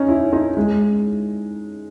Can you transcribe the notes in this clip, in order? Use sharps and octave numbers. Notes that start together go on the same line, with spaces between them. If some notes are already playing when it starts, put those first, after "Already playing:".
Already playing: C#4 D#4
E4
D#4
G#3